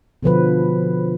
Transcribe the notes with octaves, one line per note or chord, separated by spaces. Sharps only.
B2 D3 F3 B4